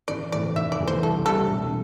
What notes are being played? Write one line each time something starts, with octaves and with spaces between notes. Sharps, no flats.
A1 D5
A2 E3 A3 C4 D5
F1 E5
D5
E2 E3 A3
C5
C2 A4
C3 G3 D4 A4
E1